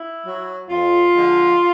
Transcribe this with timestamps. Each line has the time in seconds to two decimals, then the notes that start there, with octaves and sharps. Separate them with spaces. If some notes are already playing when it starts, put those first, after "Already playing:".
Already playing: E4
0.25 F#3
0.69 F2 F4
1.14 D3 F3 G#3